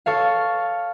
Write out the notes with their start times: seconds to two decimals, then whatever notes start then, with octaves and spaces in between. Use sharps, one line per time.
0.06 A4 C#5 F5